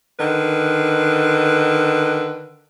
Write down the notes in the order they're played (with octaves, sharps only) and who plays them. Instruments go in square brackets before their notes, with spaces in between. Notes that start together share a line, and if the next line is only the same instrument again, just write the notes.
[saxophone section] D3 D#3 B4